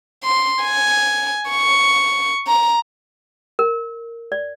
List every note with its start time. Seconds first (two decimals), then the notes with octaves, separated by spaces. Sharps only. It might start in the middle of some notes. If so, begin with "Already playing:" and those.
0.24 C6
0.63 G#5
1.51 C#6
2.48 A#5
3.59 A#4
4.32 D5